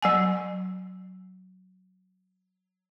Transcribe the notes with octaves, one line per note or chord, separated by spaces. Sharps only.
F#3 F#5 G#5